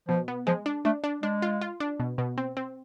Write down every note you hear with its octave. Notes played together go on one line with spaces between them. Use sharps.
B2 F3
B3
F3 G#3
D4
A3 D4
D4
G#3 D4
F4
F4
D4
B2
B2
C4
C4